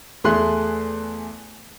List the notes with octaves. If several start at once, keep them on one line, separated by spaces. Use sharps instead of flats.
E2 A3 G#4 C6 F#6